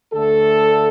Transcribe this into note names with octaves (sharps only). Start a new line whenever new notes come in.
D2 D3 A3 A4